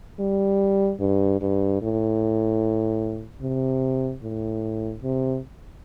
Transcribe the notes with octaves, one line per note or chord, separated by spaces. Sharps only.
G3
G2
G2
A2
C3
A2
C3